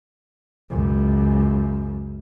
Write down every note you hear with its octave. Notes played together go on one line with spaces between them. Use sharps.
C#2 F#2